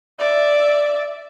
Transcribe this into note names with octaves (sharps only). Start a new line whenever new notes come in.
D5 E5